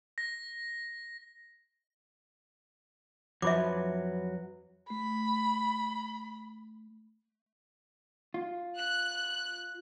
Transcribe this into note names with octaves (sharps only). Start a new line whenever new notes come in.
A#6
F2 F3 F#3 B4 E5 D6
A3 B5
F4
F#6